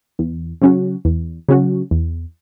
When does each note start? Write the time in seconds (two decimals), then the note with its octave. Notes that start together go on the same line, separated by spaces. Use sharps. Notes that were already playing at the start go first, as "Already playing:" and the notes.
0.19 E2
0.62 C#3 F#3 C#4 F#4
1.05 E2
1.48 C#3 F#3 C#4 F#4
1.91 E2